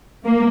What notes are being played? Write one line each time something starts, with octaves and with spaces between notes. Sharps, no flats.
A#3